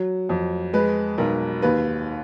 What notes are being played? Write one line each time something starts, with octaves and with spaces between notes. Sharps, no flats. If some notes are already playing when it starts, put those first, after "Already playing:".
Already playing: F#3
F2
G#3 B4
B1 A#4
D#2 B4